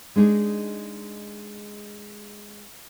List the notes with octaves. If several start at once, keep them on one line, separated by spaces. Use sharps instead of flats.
G#3 D4 D#4 G#4